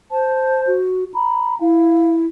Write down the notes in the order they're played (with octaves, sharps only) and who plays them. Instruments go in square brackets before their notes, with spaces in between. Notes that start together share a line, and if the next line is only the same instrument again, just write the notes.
[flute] C5 [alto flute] A5
[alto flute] F#4
[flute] A#5 [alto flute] B5
[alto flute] E4 [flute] F5